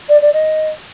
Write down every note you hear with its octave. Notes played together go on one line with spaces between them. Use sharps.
D5
D5
D#5